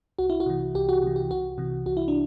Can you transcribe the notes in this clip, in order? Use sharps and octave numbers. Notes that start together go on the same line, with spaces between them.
C2 F#4
E4
F#4
C3 E3
C2 G4
F#4
C3 E3
G4
C2 F#4
C3 E3
C2 F#4
E4
D4